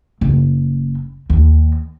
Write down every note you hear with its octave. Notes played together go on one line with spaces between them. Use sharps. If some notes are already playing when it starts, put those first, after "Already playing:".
F#1
D#2